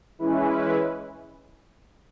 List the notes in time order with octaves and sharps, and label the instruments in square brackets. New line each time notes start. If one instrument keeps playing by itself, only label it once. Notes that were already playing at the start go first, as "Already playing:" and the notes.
[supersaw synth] E3 G#3 C#4 E4 B4